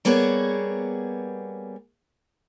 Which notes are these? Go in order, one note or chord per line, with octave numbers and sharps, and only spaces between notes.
G3 A#3 B3 G#4 C#5